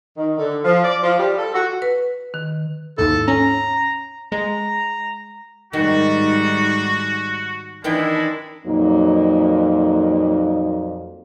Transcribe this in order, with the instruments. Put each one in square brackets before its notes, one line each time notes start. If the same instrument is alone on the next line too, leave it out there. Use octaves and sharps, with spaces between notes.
[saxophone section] D#3
D3
F3
D5
F3
G3
A4
F#4
[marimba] B4
D#3
[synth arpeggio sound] D#2 G#2 E4 [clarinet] A4
[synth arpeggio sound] C#4 [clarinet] A#5
[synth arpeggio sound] G#3 [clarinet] A#5
[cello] G#2 G3 [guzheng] D#3 [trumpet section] F#4
[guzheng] D#3 E3 G5 [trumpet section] G#3 E4 B5 [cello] D4
[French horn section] F2 A#2 F#3 A#3 D#4